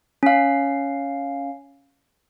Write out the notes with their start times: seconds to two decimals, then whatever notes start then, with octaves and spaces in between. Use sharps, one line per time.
0.23 C#4 F5